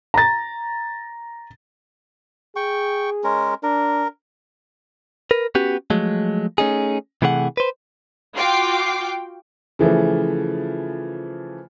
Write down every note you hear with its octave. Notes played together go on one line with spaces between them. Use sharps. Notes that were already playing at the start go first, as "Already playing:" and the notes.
A#5 A6
G#4 G5 C#6
G#3 C#4 A#4
D4 A#4
A#4 B4
B3 C#4 F#4 G4
F3 F#3 G#3 A3
A3 C#4 D#4 G#4
C3 E3 A3 G#4 C5 F#5
B4 C5
F4 F#4 G5 D6 C7
C#3 E3 F3 A3